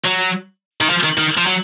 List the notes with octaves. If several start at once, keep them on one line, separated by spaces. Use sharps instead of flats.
F#3
D#3
F3
D#3
D#3
F3
F#3